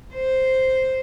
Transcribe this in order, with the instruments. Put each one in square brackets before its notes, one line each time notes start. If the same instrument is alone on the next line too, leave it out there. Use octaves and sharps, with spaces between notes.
[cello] C5